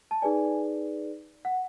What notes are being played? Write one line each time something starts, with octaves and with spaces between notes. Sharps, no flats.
A5
D#4 G#4 B4 D5 G#5
F#5